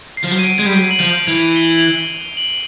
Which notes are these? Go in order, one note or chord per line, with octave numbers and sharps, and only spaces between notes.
C7
F3
F#3
D#7
D7
G#3
G3
F#3 D7
F#7
F3 F7
E3 F7
G7
F#7
F7
F#7
G7
F#7